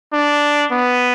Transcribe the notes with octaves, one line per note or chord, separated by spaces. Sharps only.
D4
B3